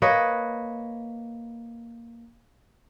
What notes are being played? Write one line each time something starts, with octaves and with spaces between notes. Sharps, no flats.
A#3 B4 C#5 D#5